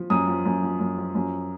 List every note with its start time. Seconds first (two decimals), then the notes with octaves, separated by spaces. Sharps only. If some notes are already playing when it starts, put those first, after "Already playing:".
Already playing: F3
0.10 F#2 D#6
0.28 F3
0.45 F#2
0.63 F3
0.80 F#2
0.98 F3
1.15 F#2